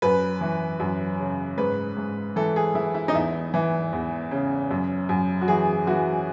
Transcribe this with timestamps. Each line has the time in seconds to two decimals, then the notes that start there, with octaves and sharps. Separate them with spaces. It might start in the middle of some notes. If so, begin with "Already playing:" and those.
0.02 F#2 B4
0.41 E3
0.80 F#2
1.19 C#3
1.58 G#2 B4
1.97 G#2
2.36 E3 A4
2.56 G#4
2.75 E3 E4
2.95 E4
3.08 D#4
3.14 E2 E4
3.54 E3
3.93 E2
4.31 C#3
4.71 F#2
5.09 F#2
5.41 F#4
5.48 E3 G#4
5.87 E3 F#4